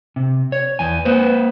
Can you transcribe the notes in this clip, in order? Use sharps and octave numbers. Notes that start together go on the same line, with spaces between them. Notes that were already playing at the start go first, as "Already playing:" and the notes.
C3
C#5
E2 G#5
A#3 B4 C5